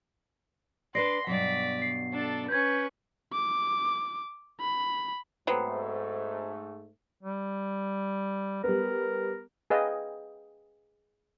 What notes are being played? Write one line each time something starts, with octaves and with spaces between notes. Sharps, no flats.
D4 B4 D5 C6 A#6 C7
G2 B2 F#3 D5 B6
C7
D4 A4
C#4 B4 G6 G#6
D6
B5
G#2 F#3 A3 B3 C4
G3
G3 B3 A#4
G#4 B4 D#5 F5 G5